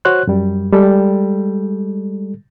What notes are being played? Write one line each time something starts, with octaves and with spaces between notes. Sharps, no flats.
F#4 C5 C#5 C6 F#6
F#2 G3
G3 G#3 A4